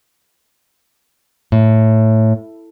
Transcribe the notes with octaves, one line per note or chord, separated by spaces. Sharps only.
A2